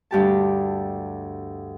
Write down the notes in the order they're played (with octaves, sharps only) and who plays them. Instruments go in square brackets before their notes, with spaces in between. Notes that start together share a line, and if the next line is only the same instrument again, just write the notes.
[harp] D2 G2 G4 A5